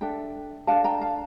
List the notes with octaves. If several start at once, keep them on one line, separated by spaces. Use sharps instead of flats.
D4 A4 E5 G5
D4 A4 F5 A5
G5 A#5
F5 A5